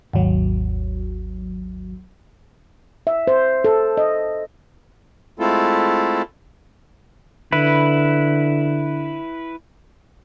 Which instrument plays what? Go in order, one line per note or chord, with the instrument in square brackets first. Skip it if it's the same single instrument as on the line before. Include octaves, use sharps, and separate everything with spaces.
[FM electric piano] G#1 D#2 F#3
[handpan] E5
C5
A4
D#5
[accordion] G#3 A3 C4 E4 F4 A4
[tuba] D3 [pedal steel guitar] E4 B4